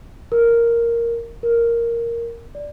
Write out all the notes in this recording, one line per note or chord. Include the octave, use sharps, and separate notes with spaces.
A#4
A#4
D5